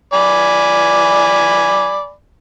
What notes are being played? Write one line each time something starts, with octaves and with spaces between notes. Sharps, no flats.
D5 G#5 B5